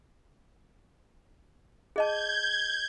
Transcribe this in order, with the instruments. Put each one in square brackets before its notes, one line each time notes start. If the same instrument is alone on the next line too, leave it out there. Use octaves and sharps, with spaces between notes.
[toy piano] G#4 D#5 A5 [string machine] G6 G#6